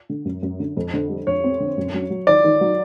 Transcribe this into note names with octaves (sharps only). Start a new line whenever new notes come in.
D3
F#2
F#2
D3
F2
D3
G3
F2 C#5
C4
D3
F#2
F#3
F#3
D#3 D5
D#3
F#3